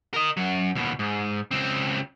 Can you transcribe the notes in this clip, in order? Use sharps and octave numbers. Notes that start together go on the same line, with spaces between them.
A#4 D#5
F#2 F#3
D#2 B2
G#2
C#2 C4